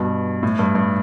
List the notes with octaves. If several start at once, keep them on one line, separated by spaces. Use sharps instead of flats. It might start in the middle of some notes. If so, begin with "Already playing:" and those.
Already playing: G2 B2
A2
G2
G2